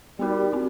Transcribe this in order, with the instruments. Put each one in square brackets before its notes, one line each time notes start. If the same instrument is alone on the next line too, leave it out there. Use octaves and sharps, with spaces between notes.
[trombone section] G3 [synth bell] B3 D#4 F#4 A#4
[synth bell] C4 D#4 F#4